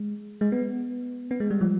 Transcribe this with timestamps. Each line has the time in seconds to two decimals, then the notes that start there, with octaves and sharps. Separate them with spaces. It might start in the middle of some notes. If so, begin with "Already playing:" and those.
Already playing: G#3
0.41 G#3
0.52 B3
1.31 B3
1.40 G#3
1.51 G3
1.61 F3